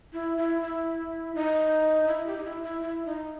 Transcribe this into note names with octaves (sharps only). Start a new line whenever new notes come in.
E4
E4
E4
D#4
E4
G4
D#4
E4
E4
E4
D#4